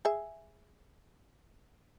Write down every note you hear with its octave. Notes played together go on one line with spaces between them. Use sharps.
G#4 E5